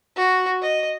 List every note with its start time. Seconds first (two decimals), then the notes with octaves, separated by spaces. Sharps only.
0.16 F#4
0.62 D#5